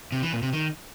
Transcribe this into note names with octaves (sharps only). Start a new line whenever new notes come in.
C3
E3
A#2
C3
D#3